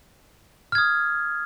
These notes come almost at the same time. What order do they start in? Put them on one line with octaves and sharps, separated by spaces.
F6 G#6 D#6